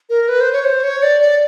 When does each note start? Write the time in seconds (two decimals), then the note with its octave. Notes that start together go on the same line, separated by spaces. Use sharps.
0.10 A#4
0.28 B4
0.40 C5
0.53 C#5
0.65 C5
0.83 C#5
1.03 D5
1.21 D5